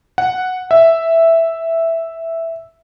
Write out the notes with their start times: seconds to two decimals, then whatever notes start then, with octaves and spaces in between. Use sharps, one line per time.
0.18 F#5
0.71 E5